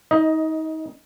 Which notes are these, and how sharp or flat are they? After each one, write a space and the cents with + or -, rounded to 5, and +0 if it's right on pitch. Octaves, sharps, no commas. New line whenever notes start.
D#4 +30 D#5 +10